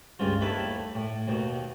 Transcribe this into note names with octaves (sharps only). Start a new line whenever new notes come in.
C#2 G2 C#3 F4
D#2 A3 E4 B4 A5 B5
A2
D#2 B2